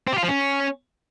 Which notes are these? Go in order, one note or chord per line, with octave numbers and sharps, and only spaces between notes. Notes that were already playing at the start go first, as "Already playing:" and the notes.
C4
G4
F4
F3
C#4